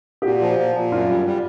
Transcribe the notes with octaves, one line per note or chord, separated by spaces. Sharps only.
G4
A#2 F#4
F3
A#2
A#2
F#2 F4
G3
G3